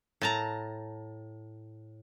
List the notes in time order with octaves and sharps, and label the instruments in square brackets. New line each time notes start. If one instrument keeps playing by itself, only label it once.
[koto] A2 A5 A#5